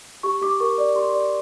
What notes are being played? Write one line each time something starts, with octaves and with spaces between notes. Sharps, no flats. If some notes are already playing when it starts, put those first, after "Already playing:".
G4 C#6
G4 D6
A#4 C#6
D5
G4 C6
D5